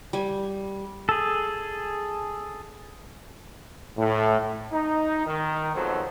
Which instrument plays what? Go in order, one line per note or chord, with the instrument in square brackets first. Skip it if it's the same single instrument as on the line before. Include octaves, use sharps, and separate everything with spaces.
[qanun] G3 G#5
[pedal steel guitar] G#4 A4
[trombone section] A2
D#4
D#3
F2 G#2 B2 F#3 A4 C5